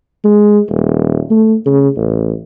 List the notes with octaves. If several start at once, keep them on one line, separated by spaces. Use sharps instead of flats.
G#3
D#1
A3
C#3
A1